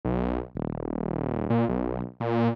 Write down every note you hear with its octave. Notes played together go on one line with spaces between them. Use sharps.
B1
D#1
A#2
B1
A#2